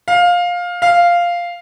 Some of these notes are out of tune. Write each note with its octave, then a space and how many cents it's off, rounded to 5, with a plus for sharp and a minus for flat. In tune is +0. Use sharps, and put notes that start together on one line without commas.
F5 +15
F5 -5